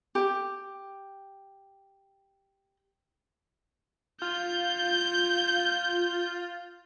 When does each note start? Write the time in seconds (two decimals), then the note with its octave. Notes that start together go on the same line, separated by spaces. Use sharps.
0.15 G4 G5
4.22 F4 G6